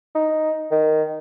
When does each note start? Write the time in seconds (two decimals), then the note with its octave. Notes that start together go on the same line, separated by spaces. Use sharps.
0.15 D#4
0.71 D#3